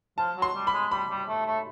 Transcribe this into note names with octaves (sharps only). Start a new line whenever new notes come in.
F3 A5
F#3
C6
G3
B5
G#3
G3 B5
G3
A3
A3